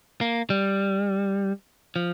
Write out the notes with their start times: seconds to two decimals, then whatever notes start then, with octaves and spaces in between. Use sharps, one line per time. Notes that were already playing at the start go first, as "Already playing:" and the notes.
0.21 A#3
0.50 G3
1.96 F3